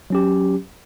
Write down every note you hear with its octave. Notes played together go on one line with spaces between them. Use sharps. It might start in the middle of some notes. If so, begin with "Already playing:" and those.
F#3 C#4 G4